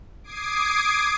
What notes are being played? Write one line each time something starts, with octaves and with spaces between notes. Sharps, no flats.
D6 D#6 G#6 C7 D7